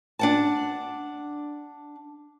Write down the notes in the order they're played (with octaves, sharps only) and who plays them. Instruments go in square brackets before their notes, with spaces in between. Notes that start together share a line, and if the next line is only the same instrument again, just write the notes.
[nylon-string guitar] D4 F#5 A5